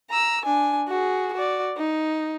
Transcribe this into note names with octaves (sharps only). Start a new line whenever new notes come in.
A#5 E6
D4 G#5
F#4 G#4
F#4 D5
D#4